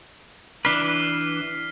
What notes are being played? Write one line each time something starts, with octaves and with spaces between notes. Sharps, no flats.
E3 D4 B4 F6 B6 C7